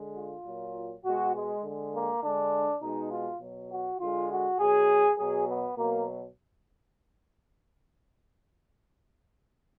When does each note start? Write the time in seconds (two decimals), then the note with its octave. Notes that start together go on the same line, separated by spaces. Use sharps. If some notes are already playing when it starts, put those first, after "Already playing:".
Already playing: D3 G#3
0.16 F4
0.46 A#2 F#3
1.05 B2 G#3 F#4
1.35 G#3
1.64 D3
1.69 G#3
1.94 A#3
2.23 D3 G#3 D4
2.82 B2 G#3 D#4
3.11 F4
3.41 B2 F#3
3.71 F#4
4.00 D3 G#3 F4
4.30 F#4
4.60 B2 F#3 G#4
5.18 B2 F#3 G#4
5.48 B3
5.78 B2 F#3 A#3